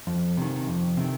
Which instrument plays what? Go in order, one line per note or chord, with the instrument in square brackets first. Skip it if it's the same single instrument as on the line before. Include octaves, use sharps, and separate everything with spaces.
[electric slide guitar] F2
C3 D#3
F2
C3 D#3